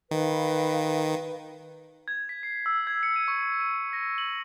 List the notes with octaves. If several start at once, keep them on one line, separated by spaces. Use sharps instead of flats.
D#3 B4 F5
G#6
B6
C7
E6
G#6
C#7
D#7
C#6
D#7
A#6
F#7